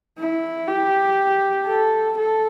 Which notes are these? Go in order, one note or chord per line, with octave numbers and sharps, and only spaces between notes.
E4
G4
A4
A4